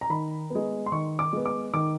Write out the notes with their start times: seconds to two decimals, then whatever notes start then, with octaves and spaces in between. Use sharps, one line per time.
0.01 A#5
0.10 D#3 B5
0.50 G#3 B3
0.86 C6
0.92 D#3 C#6
1.19 D6
1.33 G#3 B3
1.46 D6
1.74 D#3 D6